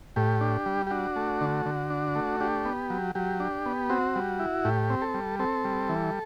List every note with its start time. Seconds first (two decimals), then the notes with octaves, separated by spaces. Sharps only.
0.16 A2 G4
0.41 D4
0.66 G3
0.87 G4
0.90 D4 F#4
1.16 A3
1.41 D3
1.66 D3
1.90 D4
2.16 A3
2.40 D4 G4
2.65 B3
2.90 F#3
3.15 F#3 G4
3.40 D4
3.66 B3
3.90 C4 F#4
4.16 G3
4.39 E4
4.65 A2 G4
4.90 C4
5.02 A4
5.14 G3
5.39 C4 A4
5.64 G3
5.89 E3